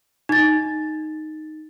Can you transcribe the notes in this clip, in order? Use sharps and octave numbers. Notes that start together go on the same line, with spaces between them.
D#4 A6